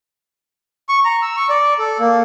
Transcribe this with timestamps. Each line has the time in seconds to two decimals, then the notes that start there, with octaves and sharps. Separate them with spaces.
0.89 C#6
1.05 A#5
1.22 E6
1.37 C#6
1.49 D5
1.79 A4
1.99 A#3